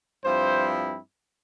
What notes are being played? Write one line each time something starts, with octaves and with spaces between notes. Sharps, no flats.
G2 F3 C4 E4 C5